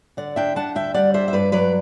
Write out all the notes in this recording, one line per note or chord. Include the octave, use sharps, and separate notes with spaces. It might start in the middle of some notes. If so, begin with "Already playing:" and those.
D3 D5 F#5
D4 E5 G5
D4 F#5 A5
D2 E5 G5
G3 D5 F#5
D4 C5 E5
E5
G2 B4 D5
F#3 B4 D5